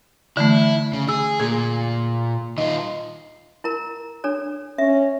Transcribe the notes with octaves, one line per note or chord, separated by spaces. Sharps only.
D3 E3 A3 E4
C#3
G#4 E6
A#2 G#4
D#3 F4 D#5
E4 A#4 A#5
D4 A4 C#5
C#4 E5